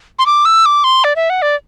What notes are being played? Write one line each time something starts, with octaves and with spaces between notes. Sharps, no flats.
C6
D6
E6
D6
C6
D5
E5
F#5
D5